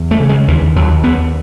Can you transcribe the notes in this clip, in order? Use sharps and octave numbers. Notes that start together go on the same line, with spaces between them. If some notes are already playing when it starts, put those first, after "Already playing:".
Already playing: E2
A3
C#3
G#3
D#2 E3
D#2 F#3
D#2 B3